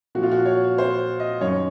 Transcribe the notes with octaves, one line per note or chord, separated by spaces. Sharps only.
A#2 F3 F#4
F4
F#4
C#5
C5
D#5
F#2 D#3 C#5